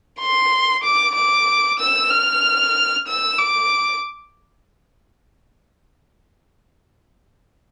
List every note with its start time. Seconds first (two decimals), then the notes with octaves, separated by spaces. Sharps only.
0.20 C6
0.84 D6
1.15 D6
1.79 E6
2.11 F6
3.08 E6
3.38 D6